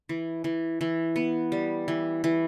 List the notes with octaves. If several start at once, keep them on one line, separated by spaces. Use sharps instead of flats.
E3
E3
E3
B3
G3
E3
E3